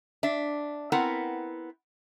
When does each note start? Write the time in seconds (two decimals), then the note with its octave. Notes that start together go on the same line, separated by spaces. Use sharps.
0.23 D4 E5
0.92 B3 C4 E4 A#4 F#5